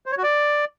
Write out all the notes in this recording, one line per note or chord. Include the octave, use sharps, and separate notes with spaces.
C5
C#5
F#4
D5